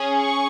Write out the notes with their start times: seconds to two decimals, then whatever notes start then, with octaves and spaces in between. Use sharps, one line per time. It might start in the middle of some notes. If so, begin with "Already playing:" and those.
Already playing: C#4 G#4
0.17 C#6